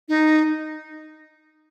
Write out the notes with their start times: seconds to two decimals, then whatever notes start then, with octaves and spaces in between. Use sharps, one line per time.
0.09 D#4